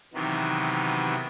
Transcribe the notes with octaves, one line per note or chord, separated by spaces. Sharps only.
C3 D#3 E3 F#3 B3